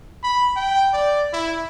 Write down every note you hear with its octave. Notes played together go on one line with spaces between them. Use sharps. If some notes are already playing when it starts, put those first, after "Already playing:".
B5
G5
D5
E4